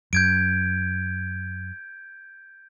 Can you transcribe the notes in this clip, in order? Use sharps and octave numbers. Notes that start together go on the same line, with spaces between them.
F#2 G6 G#6 D7